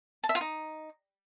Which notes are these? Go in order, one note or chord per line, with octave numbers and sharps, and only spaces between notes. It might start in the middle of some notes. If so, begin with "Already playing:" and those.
A5
E5
F4
D#4